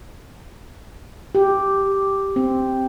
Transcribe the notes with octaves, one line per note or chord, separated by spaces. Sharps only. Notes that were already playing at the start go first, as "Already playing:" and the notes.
G4
C4